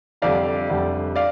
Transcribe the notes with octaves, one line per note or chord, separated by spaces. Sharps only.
F1 F2 D3 G3 D5 F5
F1 F2 D3 G3
D5 F5